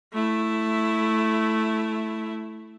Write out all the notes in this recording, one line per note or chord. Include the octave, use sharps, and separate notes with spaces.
A3 E4